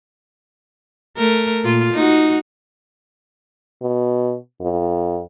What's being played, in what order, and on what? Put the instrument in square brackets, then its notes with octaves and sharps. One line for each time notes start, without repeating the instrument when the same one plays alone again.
[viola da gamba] A3 A#4
A#2 F4
D#4 F#4
[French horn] B2
F2